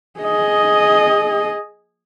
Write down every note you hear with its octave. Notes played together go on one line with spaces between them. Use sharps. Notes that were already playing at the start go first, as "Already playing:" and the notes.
G#4 D#5